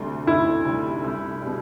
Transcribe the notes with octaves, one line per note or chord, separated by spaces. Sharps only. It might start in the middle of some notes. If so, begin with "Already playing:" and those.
Already playing: D2 C3 G3
D2 E4
C3 G3
C2
B2 G3